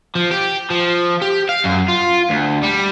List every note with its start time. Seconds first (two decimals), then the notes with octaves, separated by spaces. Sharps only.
0.15 F3
0.31 G4
0.70 F3
1.22 G4
1.49 F5
1.64 F#2
1.88 F4
2.30 D2
2.63 G3